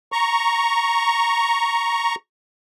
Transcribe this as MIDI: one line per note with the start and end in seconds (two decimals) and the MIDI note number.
0.12 2.15 82
0.12 2.15 85